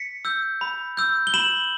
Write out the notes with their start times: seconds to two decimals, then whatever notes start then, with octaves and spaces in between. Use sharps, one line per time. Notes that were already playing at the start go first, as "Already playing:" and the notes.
Already playing: B6 C#7
0.25 E6 G6
0.61 B5
0.97 E6 G6
1.27 G7
1.34 B5 E7 F#7